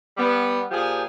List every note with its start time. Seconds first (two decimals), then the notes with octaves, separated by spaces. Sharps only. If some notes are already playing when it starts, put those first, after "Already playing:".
0.18 G3 B3
0.71 A#2 F3 G4 G#4